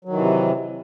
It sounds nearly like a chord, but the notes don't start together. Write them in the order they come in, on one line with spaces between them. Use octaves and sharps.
F#3 D#3 E3 C3